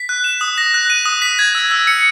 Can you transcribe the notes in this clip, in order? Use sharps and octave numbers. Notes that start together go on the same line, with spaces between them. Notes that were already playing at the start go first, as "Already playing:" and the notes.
Already playing: B6
F#6
E7
D#6
A#6
F#6
D#7
D#6
B6
G#6
E6
E6
C#7